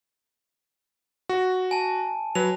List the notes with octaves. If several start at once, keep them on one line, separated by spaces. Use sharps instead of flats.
F#4
G#5 A5
F#3 B4 F7